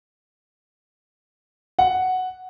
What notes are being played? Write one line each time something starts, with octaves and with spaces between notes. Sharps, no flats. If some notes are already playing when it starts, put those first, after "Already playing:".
F#5